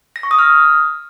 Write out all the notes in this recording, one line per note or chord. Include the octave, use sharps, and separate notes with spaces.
A#6
C#6
D#6
F6